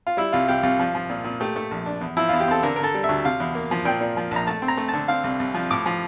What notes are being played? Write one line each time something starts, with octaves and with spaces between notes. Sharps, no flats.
F4
G3 E4
C2 F4
C2 G4
C2 F4
F3
F3
A#2
A#2
A3 G4
A3
A#1
D4
E2
F3 E4
E2 F4
G4
C4 A4
D3 A#4
A#4
D3 A4
G3
E5
D2
C3 F5
E2
A#3
F3
A#2 G5
A#2
F3
A#1 A#5
A3 A5
C4
A#5
A3
A5
D3
C4 F5
C2
C2
F3
A2 D6
F3